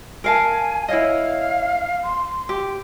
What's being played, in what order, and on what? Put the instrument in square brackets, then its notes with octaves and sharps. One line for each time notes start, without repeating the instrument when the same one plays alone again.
[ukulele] A#4 F5 A5 [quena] G#5
[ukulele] E4 C#5 D#5 [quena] F5
[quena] C6
[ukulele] G4